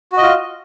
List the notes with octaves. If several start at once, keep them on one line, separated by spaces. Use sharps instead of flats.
F4 F#4 D#5